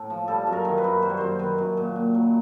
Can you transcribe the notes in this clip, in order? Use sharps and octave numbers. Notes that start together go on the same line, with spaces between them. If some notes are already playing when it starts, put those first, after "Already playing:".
Already playing: A2
F3
G3 A4
F#2
A#4
D#3
B4
F#2
G3 C5
C#5
F#2 C5
D#3 B4
F#2
A#2
A#2
F#3